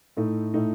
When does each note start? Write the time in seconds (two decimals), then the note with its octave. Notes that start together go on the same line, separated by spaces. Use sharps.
0.17 A2 A3 D#4
0.54 A2 A3 D#4